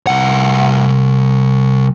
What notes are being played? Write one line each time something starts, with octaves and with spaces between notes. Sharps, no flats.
C2 F#5